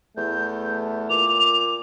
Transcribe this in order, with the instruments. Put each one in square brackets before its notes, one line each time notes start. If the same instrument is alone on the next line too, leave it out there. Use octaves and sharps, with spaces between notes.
[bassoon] E2 [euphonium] A3 [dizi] G6
[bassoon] A#2 [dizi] D6 [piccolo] F7